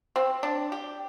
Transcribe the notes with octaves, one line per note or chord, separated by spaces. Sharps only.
C4
D4
G4